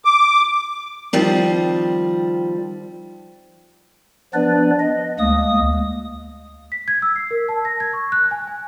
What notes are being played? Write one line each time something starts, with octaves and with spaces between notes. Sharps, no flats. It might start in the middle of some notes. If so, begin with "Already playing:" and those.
D6
D#3 F3 G3 C4
F3 B3 D4 B4 D5
D#5
D2 G#3 A#3 D#6
B6
G#6
E6
C7
A#4
A5
A#6
G#6
C#6
F#6
G#5
G#5